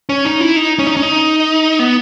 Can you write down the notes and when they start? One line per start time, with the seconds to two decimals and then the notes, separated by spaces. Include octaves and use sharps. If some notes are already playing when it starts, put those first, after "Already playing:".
0.09 C#4
0.25 D#4
0.40 E4
0.56 D#4
0.79 C#4
0.87 D#4
0.97 C#4
1.02 D#4
1.79 B3